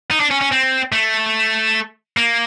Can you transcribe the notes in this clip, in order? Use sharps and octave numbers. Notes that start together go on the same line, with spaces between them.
D#4
D4
C#4
C#4
C4
A3
A#3